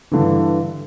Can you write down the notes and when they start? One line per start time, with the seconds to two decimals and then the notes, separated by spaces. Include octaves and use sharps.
0.12 G2 D3 E3